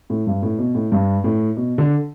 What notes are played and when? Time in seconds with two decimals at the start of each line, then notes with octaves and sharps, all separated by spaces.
0.10 A2
0.27 G2
0.42 A2
0.59 B2
0.75 A2
0.92 G2
1.24 A2
1.57 B2
1.78 D3